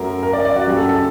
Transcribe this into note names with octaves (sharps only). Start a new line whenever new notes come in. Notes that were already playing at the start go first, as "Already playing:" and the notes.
Already playing: F#2 F#3 A3 A#4
A#4
D5
D5
F#4
F#2 F#3 A#3 G4
A4
A4